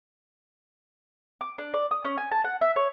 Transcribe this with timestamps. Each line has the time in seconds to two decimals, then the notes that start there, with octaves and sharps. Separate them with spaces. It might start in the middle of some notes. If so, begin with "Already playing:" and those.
1.41 D6
1.58 D4
1.74 D5
1.91 D#6
2.05 C#4
2.18 G#5
2.32 A5
2.44 F#5
2.61 E5
2.76 C#5